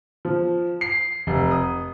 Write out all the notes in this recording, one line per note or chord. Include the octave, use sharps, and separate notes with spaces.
F3
C7
F1
D#6